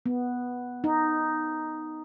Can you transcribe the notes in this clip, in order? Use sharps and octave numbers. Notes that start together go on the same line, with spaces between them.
B3
D#4